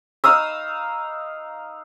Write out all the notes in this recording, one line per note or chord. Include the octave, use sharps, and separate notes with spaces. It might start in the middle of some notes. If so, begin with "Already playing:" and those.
D#4 F5 D#6 E6